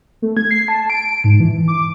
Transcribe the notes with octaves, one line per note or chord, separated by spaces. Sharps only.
A3
G#6
C7
A5
D7
G#2
E3
D6